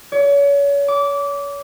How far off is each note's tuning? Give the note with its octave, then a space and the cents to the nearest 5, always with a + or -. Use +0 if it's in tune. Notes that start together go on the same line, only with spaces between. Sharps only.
C#5 +35
D6 -20